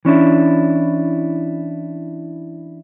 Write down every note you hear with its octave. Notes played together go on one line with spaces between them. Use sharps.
E3 C#4 D4 E4